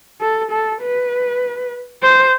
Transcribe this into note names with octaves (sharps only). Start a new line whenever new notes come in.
A4
A4
B4
C5